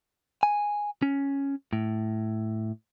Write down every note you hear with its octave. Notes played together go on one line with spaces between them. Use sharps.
G#5
C#4
A2